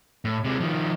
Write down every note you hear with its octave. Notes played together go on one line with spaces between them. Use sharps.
A2
C3 G#3
D#3 F3